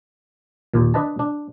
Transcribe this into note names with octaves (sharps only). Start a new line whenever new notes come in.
D#2 A#2
D4 B4 D#5 A5
D4